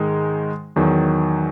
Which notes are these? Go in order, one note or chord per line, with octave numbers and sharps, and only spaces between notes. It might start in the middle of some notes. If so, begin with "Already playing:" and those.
Already playing: G#2 D#3 G#3 D#4
E2 D#3 F#3